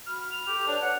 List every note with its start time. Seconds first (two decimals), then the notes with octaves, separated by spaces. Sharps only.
0.07 F#4 B5 F6
0.31 F7
0.47 G4 A4
0.67 D4 B4 C#5 D5 D6
0.82 F#5